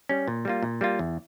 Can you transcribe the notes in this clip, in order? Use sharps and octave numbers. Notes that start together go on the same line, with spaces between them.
G3 C#4
A#2
G3 A#3 F4
A#2
G3 A#3 F4
E2